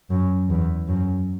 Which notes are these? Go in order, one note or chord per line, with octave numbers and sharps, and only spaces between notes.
F#2
E2
F#2